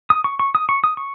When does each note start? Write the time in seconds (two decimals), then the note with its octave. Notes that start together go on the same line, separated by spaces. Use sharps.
0.10 D#6
0.24 C#6
0.39 C#6
0.55 D#6
0.69 C#6
0.84 D#6
0.97 C#6